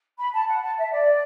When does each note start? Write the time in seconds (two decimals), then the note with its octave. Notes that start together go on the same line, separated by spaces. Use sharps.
0.18 B5
0.33 A5
0.48 F#5
0.63 A5
0.77 E5
0.92 D5